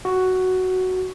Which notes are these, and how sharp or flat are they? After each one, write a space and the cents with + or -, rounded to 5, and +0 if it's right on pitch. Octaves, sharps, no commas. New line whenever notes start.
F#4 +5